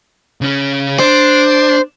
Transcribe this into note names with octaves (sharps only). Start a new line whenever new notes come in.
C#3 C#4
D4 C5